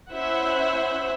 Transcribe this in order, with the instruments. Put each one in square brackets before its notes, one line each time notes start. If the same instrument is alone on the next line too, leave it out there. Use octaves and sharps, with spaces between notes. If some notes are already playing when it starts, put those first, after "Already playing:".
[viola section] C#4 E4 C5 E5 F#5